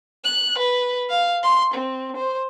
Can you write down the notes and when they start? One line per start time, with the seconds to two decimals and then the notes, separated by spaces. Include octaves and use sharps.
0.25 F#6
0.58 B4
1.10 F5
1.43 C6
1.74 C4
2.17 C5